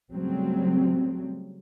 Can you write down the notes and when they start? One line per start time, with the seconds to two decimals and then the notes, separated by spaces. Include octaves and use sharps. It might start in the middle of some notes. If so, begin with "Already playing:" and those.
0.13 C#3 F#3 G3 A3 C4